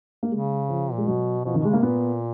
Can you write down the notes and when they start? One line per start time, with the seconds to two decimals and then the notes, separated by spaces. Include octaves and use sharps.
0.23 A#3
0.31 C#3 G#3
0.69 F3
0.93 A#2 G#3
1.07 B2 F#3
1.45 B2 F3
1.54 D#3
1.57 B2
1.65 G#3
1.70 C#3 A#3
1.83 A#2 B3